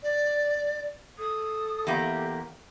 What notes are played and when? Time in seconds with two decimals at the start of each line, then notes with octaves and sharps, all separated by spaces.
0.03 D5
1.18 A4 D#6
1.87 E2 A#3 G4